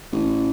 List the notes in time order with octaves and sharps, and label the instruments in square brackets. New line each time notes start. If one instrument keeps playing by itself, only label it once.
[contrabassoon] A1